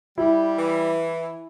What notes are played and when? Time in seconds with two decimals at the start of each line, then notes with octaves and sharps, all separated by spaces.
0.18 G3 E4
0.58 E3